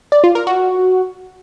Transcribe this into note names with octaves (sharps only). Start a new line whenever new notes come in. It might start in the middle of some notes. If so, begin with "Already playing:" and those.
D5
F4
A#4
F#4